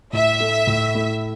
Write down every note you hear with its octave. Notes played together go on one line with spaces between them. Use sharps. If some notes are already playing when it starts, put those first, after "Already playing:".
A2 E5
A3 E4
A2
A3 E4